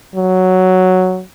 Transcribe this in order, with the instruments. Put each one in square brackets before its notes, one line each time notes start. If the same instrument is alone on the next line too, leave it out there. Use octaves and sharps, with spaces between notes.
[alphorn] F#3